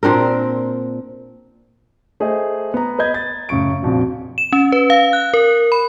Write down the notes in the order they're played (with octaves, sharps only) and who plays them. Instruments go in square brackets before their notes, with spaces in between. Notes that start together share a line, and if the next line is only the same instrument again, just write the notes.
[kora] A#2 C4 D4 A#4
[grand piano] A3 G#4 C5 D#5
B3 A#5
B4 D#5 G6 G#6
A6
F#2 A2 C#3 C#6 D7
A#1 F2 F#4
[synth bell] E7
C#4
B4
F5
F#6
A#4
B5